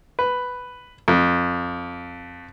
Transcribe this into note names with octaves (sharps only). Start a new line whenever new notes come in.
B4
F2